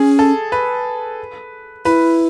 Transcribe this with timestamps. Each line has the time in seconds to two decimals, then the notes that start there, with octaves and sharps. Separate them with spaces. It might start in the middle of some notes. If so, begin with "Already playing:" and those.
Already playing: C#4 G#4
0.19 A4
0.52 B4
1.85 E4 B4